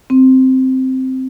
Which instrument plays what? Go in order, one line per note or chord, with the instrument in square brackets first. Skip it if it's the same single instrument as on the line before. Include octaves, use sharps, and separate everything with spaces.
[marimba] C4